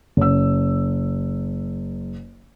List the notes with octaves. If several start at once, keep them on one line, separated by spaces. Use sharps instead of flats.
F#1 E6